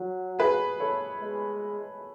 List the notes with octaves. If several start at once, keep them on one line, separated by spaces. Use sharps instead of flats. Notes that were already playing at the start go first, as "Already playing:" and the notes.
Already playing: F#3
G#4 B4
A4 C#5
G#3